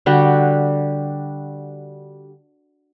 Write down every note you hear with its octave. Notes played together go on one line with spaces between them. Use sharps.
D3 G3 F#4 G4